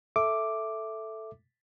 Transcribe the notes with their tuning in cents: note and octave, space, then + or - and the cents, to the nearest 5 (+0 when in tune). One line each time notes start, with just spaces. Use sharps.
A4 +0 E5 +0 D6 +0